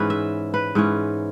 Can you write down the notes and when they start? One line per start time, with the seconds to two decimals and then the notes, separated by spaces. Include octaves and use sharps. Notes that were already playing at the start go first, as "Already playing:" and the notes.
Already playing: G#2 E3 C#4 B4
0.10 E5
0.54 B4
0.75 G#2 E3 C#4